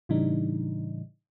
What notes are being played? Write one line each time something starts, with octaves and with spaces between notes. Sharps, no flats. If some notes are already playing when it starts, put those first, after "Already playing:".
A2 C#3 E3 G3 D4 D#4